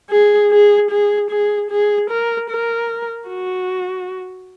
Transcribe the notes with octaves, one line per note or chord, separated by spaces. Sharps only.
G#4
G#4
G#4
G#4
G#4
A#4
A#4
F#4